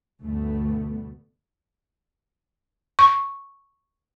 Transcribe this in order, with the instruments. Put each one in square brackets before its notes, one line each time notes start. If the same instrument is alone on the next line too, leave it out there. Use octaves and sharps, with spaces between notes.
[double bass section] D2 G2 B2 D3 A3 B3
[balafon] C#6